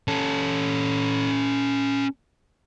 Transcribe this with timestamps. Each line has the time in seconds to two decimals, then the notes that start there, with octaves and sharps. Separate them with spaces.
0.08 C#4 A4